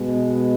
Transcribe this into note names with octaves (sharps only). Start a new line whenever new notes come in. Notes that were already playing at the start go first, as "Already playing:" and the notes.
Already playing: B2 G#3 B3